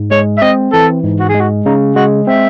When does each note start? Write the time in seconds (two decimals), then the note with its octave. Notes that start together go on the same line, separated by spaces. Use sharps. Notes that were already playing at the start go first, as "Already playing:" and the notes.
Already playing: G#2
0.11 G#3 C#5
0.38 E5
0.42 C4 D#5
0.73 E3 A4
1.03 G#2
1.20 F#4
1.29 G#4
1.35 G#3
1.40 F#4
1.65 C#3 D#4
1.96 G#3 F#4
2.27 C4 E5